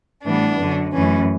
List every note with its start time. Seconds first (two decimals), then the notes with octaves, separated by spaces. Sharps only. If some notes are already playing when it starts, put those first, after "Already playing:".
0.24 A2 E3 G3 B3 D4
0.59 F#2 D3 F#3
0.93 F#2 E3 A3 C#4